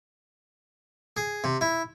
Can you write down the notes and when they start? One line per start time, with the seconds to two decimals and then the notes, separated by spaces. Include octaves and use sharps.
1.17 G#4
1.44 C3
1.61 E4